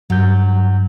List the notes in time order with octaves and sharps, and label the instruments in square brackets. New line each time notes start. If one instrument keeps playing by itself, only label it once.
[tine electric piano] G2 G6 [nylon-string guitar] F#3